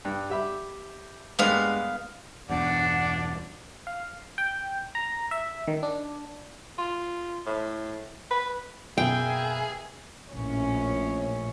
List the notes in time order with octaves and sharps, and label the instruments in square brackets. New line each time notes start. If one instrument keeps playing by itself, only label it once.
[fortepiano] G2
G4 E5 B5
[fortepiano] G2 G#3 A#3 [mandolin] B3 F5
[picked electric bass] E2 G2 B2 [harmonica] D4 D5 [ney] F#5
[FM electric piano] F5
G5
A#5
E5
D#3
D4
[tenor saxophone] F4
A2
B4
[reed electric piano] F#2 B2 [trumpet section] A#3 B4 E5 [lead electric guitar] G#4 [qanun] G5
[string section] A#1 A2 C#4